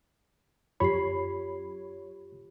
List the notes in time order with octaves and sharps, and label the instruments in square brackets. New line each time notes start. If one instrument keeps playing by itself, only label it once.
[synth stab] F#2 C#5 [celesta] F4 G4 C7 [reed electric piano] B5